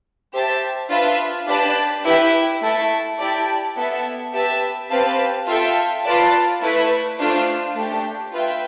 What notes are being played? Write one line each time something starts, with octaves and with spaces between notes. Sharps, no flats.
G4 C5 E5 A5
D4 F4 B4 E5
D4 G4 B4 D5 A5
E4 G4 B4 E5
A3 E4 A4 E5 A5
E4 G4 D5 A5
B3 E4 A4 E5
G4 B4 E5 A5
C4 G4 B4 F5 A5
F4 A4 E5 G5
F4 B4 D5 A5
A3 E4 B4
A3 D4 F4 C5
A3 D4 G4
F4 B4 E5 G5